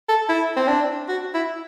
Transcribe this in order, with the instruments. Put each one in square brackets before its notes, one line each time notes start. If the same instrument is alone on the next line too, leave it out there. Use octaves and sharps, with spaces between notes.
[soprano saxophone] A4
E4
C4
D4
F#4
E4